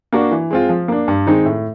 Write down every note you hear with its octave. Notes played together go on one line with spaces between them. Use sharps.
A#3 D4 F#4
E3
G#3 C4 F4
F3
A#3 D4
G2
D#3 G#3 C4 D#4
A2